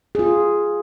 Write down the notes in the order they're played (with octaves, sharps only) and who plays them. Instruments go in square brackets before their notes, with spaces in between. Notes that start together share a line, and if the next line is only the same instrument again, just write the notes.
[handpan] F4 G#4